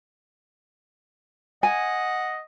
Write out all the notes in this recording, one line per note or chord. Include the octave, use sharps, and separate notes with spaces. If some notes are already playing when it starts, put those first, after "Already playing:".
D#5 F#5 G#5